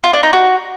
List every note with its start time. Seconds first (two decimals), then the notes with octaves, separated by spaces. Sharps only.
0.04 F4
0.13 D4
0.23 D#4
0.33 F#4